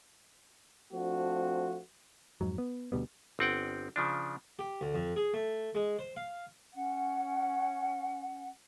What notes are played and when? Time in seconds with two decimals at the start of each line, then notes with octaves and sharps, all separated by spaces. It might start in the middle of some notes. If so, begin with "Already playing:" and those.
0.93 F3 A3 C4 D4 F#4
2.41 F2 G#2 F#3
2.58 B3
2.92 D2 B2 G3 B3
3.39 G1 C4 F#5 G5
3.96 C#3 F3 D4
4.59 G4
4.81 D2
4.94 F2
5.16 G#4
5.34 A3
5.75 G#3
5.99 C5
6.17 F5
6.73 C#4 F#5